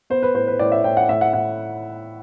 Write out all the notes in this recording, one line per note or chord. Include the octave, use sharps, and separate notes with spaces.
B3 C5
B4
A2 C5
B4
A2 D5
E5
A2 G5
F#5
A2 E5
F#5
A2 F#5